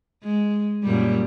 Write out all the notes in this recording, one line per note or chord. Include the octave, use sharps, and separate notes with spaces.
G#3
F#2 A#2 G3